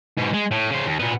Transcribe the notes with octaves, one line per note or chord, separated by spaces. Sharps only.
G#2 B2
G#3
A2
C#3 C5
D#2
A#2 B3